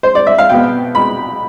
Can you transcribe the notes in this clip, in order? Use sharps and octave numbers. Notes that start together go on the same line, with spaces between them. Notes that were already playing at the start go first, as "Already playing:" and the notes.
C5
D5
E5
F5
B2 B3 G5
B5